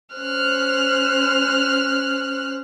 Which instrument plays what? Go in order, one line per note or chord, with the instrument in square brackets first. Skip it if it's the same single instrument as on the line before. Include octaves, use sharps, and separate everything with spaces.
[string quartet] C#4 C5 F6 F#6